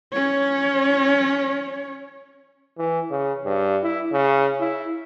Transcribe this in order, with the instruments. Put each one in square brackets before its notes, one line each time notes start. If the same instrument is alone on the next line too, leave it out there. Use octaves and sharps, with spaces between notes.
[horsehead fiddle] C#4 C#5
[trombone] E3
C#3
G2
E4
C#3
E4